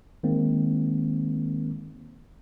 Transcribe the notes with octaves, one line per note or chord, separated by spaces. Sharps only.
D#3 G#3 A#3 C4